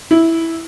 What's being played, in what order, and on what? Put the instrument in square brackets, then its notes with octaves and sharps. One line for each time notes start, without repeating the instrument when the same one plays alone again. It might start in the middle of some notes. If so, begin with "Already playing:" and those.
[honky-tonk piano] E4